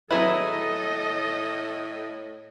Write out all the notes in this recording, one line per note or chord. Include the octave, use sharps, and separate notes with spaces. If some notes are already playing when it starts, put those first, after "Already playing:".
A2 F#3 E4 G#4 A4 B4 D#5